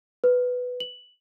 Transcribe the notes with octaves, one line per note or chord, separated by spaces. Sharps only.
B4
F#7